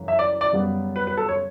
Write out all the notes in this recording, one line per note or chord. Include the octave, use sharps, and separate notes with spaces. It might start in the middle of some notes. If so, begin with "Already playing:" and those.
Already playing: F#2 C#3 E3
E5
D5
D5
F#2 C#3 G3 B3
B4
B4
A4
C#5